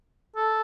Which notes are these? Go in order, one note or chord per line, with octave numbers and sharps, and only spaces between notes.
A4